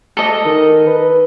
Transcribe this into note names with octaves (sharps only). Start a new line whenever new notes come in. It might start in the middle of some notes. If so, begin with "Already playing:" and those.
A4 D#5
D#3
B4